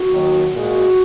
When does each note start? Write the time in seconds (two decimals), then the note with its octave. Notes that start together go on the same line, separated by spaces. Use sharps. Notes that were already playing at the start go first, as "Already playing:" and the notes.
Already playing: F#4
0.10 D#2 D#3 F#3
0.51 A#2 G#3 F#4